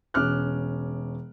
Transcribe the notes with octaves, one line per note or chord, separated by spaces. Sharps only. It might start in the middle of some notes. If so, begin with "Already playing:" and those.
E1 C#4 D6 F6 F#6